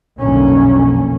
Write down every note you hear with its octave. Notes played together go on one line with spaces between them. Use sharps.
B1 F2 D3 A#3 C#4